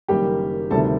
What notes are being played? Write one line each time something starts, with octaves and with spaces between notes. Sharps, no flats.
F#1 F#2 D#3 G3 A#3 G4 G5
D2 C3 D#3 G3 A4 A5